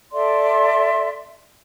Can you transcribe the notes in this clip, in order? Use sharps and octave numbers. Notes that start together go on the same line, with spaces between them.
A4 D5 E5 C6